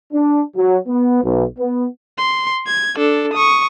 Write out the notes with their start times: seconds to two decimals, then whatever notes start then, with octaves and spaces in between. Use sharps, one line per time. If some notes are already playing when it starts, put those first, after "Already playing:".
0.13 D4
0.56 F#3
0.88 B3
1.23 B1
1.58 B3
2.18 C6
2.67 G#6
2.97 D4 A4
3.34 C#6 D#6